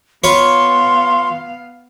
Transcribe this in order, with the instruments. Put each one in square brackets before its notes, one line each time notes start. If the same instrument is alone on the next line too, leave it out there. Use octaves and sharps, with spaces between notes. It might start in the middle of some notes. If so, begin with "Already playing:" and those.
[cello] B3 F5 [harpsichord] F4 B4 C#5 [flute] C6